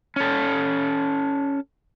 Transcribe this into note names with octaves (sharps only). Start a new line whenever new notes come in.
C#4 A4